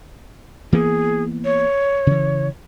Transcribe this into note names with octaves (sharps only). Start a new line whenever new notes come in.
E3 A#3 B3 G#4
C#5
C#3 E3